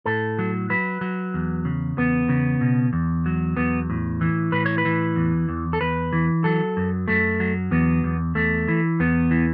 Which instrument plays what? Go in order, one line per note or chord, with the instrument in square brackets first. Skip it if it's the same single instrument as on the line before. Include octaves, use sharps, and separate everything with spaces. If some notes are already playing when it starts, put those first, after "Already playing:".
[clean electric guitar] A2 A4
F#3
F#3 B4
F#3
E2
C#3
E2 B3
C#3
B2
E2
F#3
E2 B3
A2
E3
A2 B4
C#5
B4
E3
E2
E2
A4
E2 B4
E3
F#3 A4
F#2
F#2 A3
F#3
E2 B3
E2
E2 A3
E3
E2 B3
E3